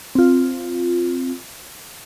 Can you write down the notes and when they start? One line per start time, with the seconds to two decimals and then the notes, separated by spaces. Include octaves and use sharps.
0.15 C4 F4